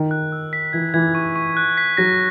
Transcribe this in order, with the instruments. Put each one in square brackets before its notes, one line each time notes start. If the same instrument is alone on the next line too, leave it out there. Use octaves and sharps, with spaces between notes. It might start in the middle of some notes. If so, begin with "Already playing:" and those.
Already playing: [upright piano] D#3
[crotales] F#6
E6
B6
[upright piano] E3 [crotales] G#6
[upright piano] E3 [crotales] G#6
[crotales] C#6
C#6
F#6
B6
[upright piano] F#3 [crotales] A#6